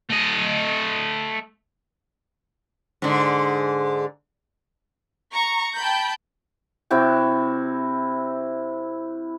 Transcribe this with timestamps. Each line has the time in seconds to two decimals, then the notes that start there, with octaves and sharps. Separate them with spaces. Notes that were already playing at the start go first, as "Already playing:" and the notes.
0.10 A3 D#5
3.02 G#2 D3
5.33 A#5 C#6
5.77 G5 A5 B5 G6
6.91 C3 E4 F#4 G5